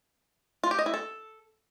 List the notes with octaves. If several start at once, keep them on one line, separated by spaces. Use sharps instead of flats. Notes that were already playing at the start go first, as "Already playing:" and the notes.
F4
G4
D#5
E4
A4